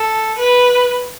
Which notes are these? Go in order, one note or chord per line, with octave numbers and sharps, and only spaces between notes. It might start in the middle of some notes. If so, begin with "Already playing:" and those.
Already playing: A4
B4